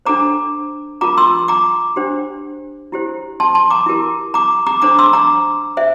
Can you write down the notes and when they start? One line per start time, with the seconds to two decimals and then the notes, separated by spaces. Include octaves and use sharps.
0.06 D4 A4 C5 A#5 D6
1.01 F4 A#4 A#5 D6
1.18 C6 E6
1.48 A#5 D6
1.96 D4 G4 C5
2.92 E4 G4 C5
3.40 A5 C6
3.55 A5 C6
3.70 A#5 D6
3.86 E4 G4 A#4
4.34 A#5 D6
4.67 A#5 D6
4.82 D4 A4 C5 A#5 D6
4.99 C6 E6
5.13 A#5 D6
5.77 C5 E5